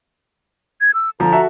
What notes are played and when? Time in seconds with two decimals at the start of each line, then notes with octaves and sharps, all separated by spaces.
0.81 G#6
0.94 E6
1.20 D3 F3 A#5
1.32 F#4 A4 E5